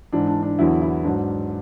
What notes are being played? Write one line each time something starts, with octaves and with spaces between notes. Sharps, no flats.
G#2 E3 D4
D4
D4
E2 D3 F#3 E4
E4
G#2 F#3 D4